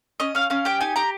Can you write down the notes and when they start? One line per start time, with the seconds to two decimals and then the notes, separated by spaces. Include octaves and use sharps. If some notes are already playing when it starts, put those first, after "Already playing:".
0.20 C#4 D#5
0.35 C#4 F5
0.50 C#4 F5
0.65 G4 G5
0.81 D#4 G#5
0.96 G4 A#5